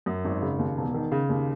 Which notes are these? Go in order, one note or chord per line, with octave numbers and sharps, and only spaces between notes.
F#2
G#1
C#3
D#2
E1
D#3
C#3
D#2